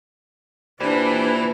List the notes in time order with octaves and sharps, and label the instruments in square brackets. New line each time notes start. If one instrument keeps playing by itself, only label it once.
[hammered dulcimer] A#2 [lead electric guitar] E3 [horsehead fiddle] D4 B4 [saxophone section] E4 G4 C5